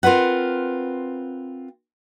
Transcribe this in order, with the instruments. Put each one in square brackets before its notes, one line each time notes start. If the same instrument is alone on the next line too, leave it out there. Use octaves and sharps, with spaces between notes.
[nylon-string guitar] C4 F4 A#4 B4 F#5